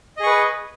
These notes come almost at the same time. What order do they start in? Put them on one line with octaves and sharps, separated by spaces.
D#5 G#4 C#6 B4